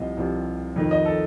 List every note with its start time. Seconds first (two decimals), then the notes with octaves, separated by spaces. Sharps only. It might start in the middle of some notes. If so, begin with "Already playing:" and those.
Already playing: C2 C3 F3 D#5
0.17 C2 C3 F3
0.76 F2 D#3
0.91 D#5
1.05 A4